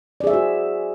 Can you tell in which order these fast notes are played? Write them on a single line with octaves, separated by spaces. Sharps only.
D5 G#4 E5 C5 F#4